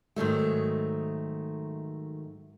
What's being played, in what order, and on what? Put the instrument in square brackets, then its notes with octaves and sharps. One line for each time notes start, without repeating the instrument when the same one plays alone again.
[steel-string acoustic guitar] G#2 D#3 F#3 A3